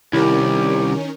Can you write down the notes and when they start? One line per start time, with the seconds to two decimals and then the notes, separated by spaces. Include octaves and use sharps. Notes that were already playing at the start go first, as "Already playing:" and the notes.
0.13 C2 D#3 C#4 E4 G4 A#4